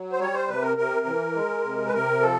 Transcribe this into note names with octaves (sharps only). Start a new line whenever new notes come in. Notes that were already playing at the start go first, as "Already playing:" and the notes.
Already playing: F#3
C5
G3 C#5
C5
C3 B4
A#4
C3 A#4
E3
G#3
C3
B4
C3 A#4
F3 A4